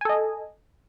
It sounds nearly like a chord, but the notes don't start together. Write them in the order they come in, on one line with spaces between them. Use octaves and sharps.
G#5 A4 D#5